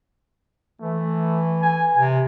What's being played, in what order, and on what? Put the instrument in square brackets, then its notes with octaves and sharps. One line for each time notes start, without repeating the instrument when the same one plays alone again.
[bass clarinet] E3 [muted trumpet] A3
[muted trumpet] G#5
[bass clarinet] C3 [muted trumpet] G#5